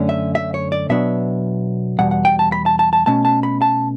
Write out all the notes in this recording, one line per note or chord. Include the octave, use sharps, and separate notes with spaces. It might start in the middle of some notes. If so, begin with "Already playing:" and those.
Already playing: F#2 D3 A3 C#4
E5
E5
C#5
D5
B2 F#3 B3 D4 E5
E2 B2 G3 F#5
F#5
G5
A5
B5
A5
A5
A5
B2 A3 C#4 A5
A5
B5
A5